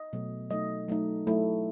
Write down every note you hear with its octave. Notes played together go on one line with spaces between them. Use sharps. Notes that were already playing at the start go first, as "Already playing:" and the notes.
Already playing: D#5
B2 F#3 A3
F#3 A3 D#4 D#5
F#3 A3 D#4
F#3 A3 E4